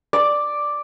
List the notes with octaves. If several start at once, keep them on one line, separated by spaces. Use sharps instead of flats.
D5